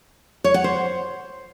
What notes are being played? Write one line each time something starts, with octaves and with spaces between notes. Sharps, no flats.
C#5
F#5
C5